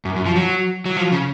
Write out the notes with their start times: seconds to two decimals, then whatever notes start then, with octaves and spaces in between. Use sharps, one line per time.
0.05 F#2
0.16 F#2
0.26 F3
0.36 F#3
0.86 F#3
0.97 F3
1.12 C#3